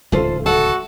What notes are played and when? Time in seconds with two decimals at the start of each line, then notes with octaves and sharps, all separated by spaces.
0.12 D1 C#2 D#3 F4 A4 C5
0.46 F#4 A4 F#5